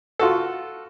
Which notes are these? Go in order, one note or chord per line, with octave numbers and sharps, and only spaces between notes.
F4 F#4 A4